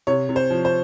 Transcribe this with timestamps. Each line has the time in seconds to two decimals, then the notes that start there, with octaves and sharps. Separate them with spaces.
0.07 C3 C#5
0.29 C3
0.36 C5
0.50 F3
0.65 C5